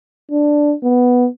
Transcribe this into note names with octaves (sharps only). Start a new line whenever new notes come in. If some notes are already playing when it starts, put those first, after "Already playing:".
D4
B3